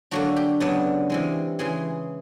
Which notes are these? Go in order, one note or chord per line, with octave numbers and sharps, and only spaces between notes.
D3 F#3 A#3 D4 F#4
G4
C#3 F#3 B3 D4
C3 E3 G#3
C#3 E3 G#3 G#4